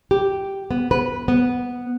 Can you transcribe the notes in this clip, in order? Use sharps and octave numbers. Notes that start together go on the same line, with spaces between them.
G4
B3
B4
B3